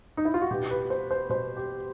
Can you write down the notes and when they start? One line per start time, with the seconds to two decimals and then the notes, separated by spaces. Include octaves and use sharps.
0.17 D#4
0.25 E4
0.34 F4
0.41 F#4
0.51 B2 G4
0.70 B4
0.90 C5
1.11 C5
1.29 B2 C5
1.57 G4